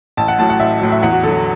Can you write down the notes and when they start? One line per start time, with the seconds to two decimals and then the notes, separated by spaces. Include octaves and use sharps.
0.17 A1 A5
0.28 F#5
0.38 A2 F#3 A5
0.50 F#5
0.60 A1 E5
0.81 A2 F#3
0.92 E5
1.03 E2 F#5
1.13 F#4
1.23 D3 F#3 A4